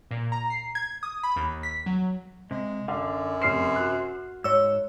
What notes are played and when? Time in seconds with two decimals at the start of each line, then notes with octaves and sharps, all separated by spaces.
0.11 A#2
0.32 A#5
0.50 C7
0.75 G#6
1.03 D#6
1.23 B5
1.36 D#2
1.63 B6
1.86 F#3
2.51 C3 G#3
2.88 F#2 D3 F5
3.42 F1 C5 F6 C7
3.76 F#4 F#6
4.44 G#2 C#5 E6